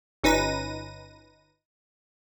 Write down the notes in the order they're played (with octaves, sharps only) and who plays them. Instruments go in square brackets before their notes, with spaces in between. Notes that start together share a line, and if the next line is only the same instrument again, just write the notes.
[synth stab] G1 C#4 D#4 B4 A#6 D#7